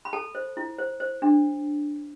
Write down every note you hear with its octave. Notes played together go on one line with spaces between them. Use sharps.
B5
A4 A5
C5
E4
C5
C5
D4